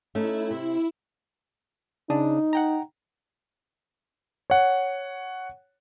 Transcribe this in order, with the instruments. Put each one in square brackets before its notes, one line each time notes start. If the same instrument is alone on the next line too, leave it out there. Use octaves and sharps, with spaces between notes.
[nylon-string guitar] A3 C#4 D#4 [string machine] E4
[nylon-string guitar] C3
[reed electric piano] C#3 D4 D#6 [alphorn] D#4
[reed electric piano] F#5 G5 A#5
[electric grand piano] C#5 F#5